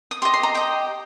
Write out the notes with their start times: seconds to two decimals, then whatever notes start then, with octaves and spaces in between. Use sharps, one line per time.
0.11 D#6
0.22 G4 D#5 C6
0.34 C6
0.43 A#5
0.54 G4 D#5 G5